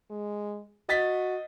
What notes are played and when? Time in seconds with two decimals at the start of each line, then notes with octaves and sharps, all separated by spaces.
0.10 G#3
0.89 F#4 D#5 A6 B6